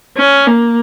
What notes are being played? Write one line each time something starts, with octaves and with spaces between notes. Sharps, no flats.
C#4
A#3